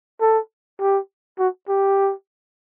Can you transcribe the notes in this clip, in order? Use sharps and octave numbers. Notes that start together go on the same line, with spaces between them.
A4
G4
F#4
G4